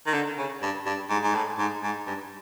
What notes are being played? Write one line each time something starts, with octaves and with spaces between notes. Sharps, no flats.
D#3
D3
C#3
G2
G2
G#2
G#2
A2
G#2
G#2
G2